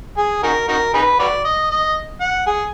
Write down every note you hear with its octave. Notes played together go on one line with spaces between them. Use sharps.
G#4
D#4 F#4 A#4
D#4 F#4 A#4
D#4 G#4 B4
F#4 B4 D5
D#5
D#5
F#5
G#4